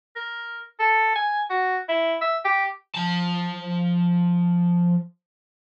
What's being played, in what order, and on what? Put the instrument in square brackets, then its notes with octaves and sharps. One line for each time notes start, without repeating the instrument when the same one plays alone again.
[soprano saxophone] A#4
A4
G#5
F#4
E4
E5
G4
[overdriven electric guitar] F3 A5